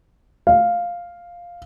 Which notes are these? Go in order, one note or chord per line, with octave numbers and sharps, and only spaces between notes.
F5